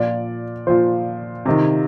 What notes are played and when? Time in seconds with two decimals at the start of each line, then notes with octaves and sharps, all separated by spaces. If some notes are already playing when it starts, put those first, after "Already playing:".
Already playing: A#2 F3 D5
0.67 A#2 F3 C5
1.46 C3 D#3